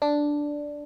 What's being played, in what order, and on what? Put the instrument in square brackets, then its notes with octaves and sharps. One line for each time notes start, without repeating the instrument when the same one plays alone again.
[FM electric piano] D4